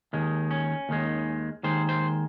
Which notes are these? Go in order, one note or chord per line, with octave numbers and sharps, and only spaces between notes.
D#2 D#3 G#3
C#4
D#2 D#3 G#3
D#2 D#3 G#3 C5
C5